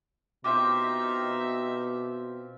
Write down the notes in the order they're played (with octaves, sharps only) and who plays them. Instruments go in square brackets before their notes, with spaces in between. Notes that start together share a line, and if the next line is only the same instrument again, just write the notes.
[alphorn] B2 [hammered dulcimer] C4 F4 G4 [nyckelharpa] D#4 E5 [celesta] D6